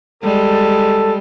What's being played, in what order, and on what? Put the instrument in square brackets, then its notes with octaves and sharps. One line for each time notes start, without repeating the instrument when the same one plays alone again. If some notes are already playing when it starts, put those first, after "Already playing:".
[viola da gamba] G3 G#3 [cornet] A4